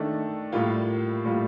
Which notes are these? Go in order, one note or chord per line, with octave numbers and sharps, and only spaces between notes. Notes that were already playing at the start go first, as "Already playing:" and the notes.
Already playing: D#3 A3 D4 A4 D#5
A2 G3 A#3 F4
A2 G3 A#3 F4